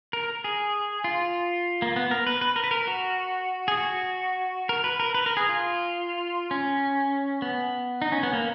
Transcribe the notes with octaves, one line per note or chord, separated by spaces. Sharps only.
A#4
G#4
F4
A#3
B3
A#4
B4
B4
A#4
B4
A#4
F#4
G#4
F#4
A#4
B4
A#4
B4
A#4
G#4
F4
C#4
B3
D#4
C#4
B3
A#3